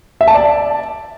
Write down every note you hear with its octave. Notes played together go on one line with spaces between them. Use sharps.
E5
A5
D5